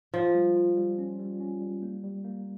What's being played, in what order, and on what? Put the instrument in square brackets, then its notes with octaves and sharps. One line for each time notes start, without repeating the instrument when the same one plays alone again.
[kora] F3 [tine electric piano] F4
[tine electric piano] G3
F4
G3
C#4
G3
C#4
G3
A#3
G3
A#3